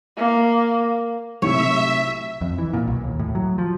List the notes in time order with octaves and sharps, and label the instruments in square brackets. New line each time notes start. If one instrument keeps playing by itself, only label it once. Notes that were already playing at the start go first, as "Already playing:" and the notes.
[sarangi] A#3
[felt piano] B1 A2 C3 [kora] C#5 [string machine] E5
[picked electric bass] F2
E3
A#2
B1
D#2
A2
F#3
F3